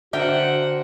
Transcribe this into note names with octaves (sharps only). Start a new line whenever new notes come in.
D3 F#4 A#4 C5 E5 F#5 G5